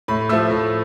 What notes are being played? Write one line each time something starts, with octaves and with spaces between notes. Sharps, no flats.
A2 B5
F3 A3 E6
A2